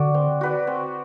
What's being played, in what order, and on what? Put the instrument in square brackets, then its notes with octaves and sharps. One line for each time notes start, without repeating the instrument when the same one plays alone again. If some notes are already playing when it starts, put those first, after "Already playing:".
Already playing: [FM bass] D3 [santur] F#4 D5
[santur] C4
F#4 B4 D5
C4